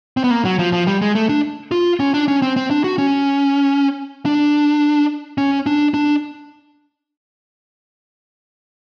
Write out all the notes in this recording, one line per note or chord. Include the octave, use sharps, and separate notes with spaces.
C4
B3
A#3
F#3
F3
F3
G3
G#3
A3
D4
F4
C#4
D4
C#4
C4
C4
D4
F#4
C#4
D4
C#4
D4
D4